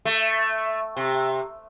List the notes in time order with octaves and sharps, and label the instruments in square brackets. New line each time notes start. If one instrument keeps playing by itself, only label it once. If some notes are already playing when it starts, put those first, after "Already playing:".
[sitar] A3
C3